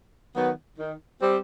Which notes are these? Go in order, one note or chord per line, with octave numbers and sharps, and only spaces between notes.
D#3 F#3 B3
D#3
G3 C4